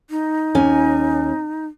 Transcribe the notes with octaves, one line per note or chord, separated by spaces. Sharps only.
D#4
D#2 C#4 G#5